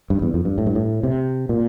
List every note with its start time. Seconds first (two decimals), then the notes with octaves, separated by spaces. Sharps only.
0.10 G2
0.22 E2
0.34 F2
0.45 G2
0.58 A2
0.66 G2
0.75 A2
1.03 C3
1.49 A#2